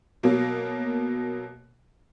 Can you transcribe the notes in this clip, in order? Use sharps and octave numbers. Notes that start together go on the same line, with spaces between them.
B2 F#3 A#3